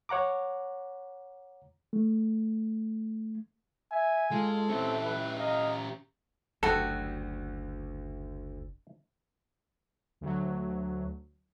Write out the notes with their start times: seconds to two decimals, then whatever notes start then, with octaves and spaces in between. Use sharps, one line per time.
0.09 C#5 F#5 A#5 D6
1.93 A3
3.92 E5 G#5
4.31 G#3 F4 A4
4.69 E3 C4 C#4 G4
5.04 B4
5.39 D#5 F5 A#5
6.63 F#1 D2 G3 F#4 A4
10.21 D2 F#3